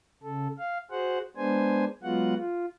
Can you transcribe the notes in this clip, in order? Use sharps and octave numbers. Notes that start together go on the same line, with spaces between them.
C#3 A4
F5
F#4 G#4 C5 F#5
G#3 B3 D4 C5 G#5
F#3 G#3 B3 F4 F#4 F#5
F4